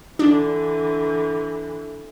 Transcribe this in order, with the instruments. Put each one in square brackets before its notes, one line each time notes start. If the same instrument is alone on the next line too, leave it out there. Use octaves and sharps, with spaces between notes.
[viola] D3 E3 [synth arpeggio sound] D4